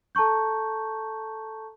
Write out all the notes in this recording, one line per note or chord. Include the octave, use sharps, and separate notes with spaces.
A4 A5 A#5 C#6 G6